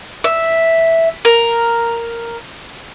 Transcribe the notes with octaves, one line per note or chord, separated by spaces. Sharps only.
E5
A#4